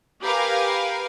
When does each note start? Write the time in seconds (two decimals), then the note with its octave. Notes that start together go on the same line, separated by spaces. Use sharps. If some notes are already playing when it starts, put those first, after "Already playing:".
0.23 G4 A#4 B4 F5 G#5